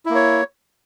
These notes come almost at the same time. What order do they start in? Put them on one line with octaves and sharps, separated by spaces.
E4 A#3 C#5